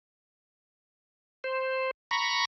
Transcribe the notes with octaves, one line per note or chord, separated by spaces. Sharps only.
C5
A#5 B5 C#6